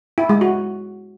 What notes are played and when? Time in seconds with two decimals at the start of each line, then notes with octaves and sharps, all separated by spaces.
0.18 E4
0.29 G#3
0.41 F#4